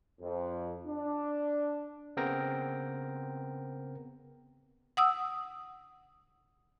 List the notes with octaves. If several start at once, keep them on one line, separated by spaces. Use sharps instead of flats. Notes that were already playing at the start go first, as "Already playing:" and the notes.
F2
D4
C#3 B3 C4 A#4 G5 A#6
F#5 D#6 E6